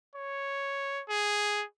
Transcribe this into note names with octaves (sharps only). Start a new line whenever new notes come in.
C#5
G#4